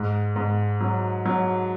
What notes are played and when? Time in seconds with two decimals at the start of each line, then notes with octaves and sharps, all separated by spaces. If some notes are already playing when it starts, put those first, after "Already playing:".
Already playing: G#2
0.36 G#2
0.81 F#3
1.26 F#3